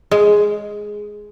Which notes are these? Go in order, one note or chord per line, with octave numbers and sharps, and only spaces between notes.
G#3